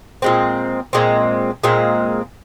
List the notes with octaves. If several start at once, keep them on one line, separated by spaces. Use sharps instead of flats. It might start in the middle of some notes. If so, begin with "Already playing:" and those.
A#2 G#3 C4
A#2 G#3 C4
A#2 G#3 C4